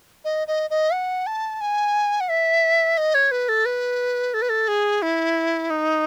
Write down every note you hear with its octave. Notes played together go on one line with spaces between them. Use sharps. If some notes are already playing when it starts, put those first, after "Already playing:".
D#5
D#5
D#5
F#5
A5
G#5
F#5
E5
D#5
C#5
B4
A4
B4
A4
B4
A4
G#4
E4
D#4